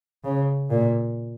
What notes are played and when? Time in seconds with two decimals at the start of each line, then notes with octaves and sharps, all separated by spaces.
0.24 C#3
0.70 A#2